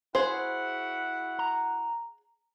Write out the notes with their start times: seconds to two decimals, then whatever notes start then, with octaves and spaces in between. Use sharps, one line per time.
0.15 E4 F#4 G#4 C5 F#5
1.39 A#5